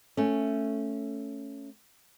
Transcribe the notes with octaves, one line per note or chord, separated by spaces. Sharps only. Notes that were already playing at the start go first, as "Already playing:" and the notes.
A3 C#4